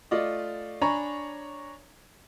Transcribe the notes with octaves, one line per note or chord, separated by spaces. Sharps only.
A3 F4 D5 D#5
D4 C#5 G#5 A#5 B5